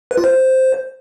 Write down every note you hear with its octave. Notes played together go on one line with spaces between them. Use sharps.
B4
F4
C5